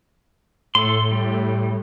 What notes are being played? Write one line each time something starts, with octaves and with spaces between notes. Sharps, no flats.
A2 A4 C6
G3